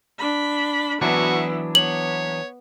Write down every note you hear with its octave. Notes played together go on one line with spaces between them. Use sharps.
D4 B5
E3 F#3 B3 D4 E4 F#4
B3 C#5 F#7